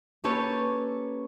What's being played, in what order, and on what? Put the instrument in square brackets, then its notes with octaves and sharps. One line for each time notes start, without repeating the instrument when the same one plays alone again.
[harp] A#3 C#4 G4 A4 B4 C#5